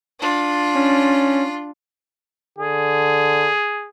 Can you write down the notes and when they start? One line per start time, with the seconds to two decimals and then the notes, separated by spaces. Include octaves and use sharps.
0.20 D4 F4
0.75 C#4
2.58 D3 G#4